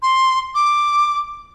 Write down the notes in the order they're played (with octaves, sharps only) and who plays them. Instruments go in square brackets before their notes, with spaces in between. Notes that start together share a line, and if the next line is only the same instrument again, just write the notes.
[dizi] C6
D6